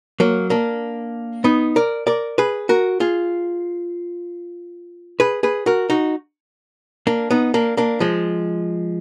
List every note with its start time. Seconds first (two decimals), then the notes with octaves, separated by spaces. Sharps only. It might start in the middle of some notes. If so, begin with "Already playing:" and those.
0.20 F#3 A#3
0.50 A#3 D4
1.44 B3 D#4
1.76 A#4 D5
2.07 A#4 D5
2.38 G#4 B4
2.69 F#4 A#4
3.00 F4 G#4
5.20 G#4 B4
5.43 G#4 B4
5.66 F#4 A#4
5.90 D#4 F#4
7.07 A#3 D4
7.31 B3 D#4
7.54 A#3 D4
7.77 A#3 D4
8.00 F3 G#3